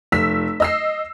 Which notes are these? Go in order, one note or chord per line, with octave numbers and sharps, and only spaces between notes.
F1 E6 B6
D#5 E6 C7